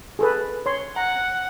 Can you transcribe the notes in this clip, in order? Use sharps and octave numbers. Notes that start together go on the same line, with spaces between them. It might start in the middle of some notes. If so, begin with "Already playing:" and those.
G#4 A4 B4
C#5 C6
F#5 A#5